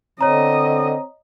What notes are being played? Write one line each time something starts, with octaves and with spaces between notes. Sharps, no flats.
D3 C4 C#5 D#5 A#5